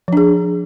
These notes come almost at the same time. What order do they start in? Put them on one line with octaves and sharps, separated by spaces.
F3 D4 G#4